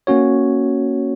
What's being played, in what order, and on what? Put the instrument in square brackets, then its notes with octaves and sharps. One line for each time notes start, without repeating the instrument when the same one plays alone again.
[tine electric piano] A#3 C#4 F#4 C#5